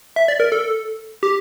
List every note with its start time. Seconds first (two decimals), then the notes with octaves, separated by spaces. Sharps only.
0.16 E5
0.28 D5
0.40 A#4
0.52 A4
1.23 G4